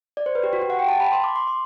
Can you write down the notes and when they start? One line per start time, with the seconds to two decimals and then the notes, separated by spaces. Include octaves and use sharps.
0.17 D5
0.26 C5
0.35 B4
0.43 G4
0.53 F#4
0.62 G4
0.70 F#5
0.79 G5
0.88 A5
1.00 B5
1.12 C6
1.24 D6
1.36 C6
1.48 C6